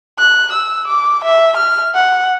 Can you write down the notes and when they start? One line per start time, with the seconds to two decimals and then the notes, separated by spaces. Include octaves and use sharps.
0.19 F#6
0.52 E6
0.87 D6
1.24 E5
1.57 F6
1.94 F#5